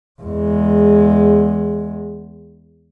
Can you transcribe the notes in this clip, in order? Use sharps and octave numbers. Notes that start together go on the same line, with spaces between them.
E2 G#3